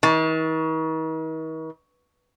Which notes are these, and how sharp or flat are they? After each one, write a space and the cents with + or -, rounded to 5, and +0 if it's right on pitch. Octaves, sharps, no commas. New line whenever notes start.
D#3 +45